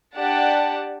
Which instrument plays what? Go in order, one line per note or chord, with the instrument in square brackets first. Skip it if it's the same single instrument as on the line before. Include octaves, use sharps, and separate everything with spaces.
[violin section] D4 G4 D5 F#5 A5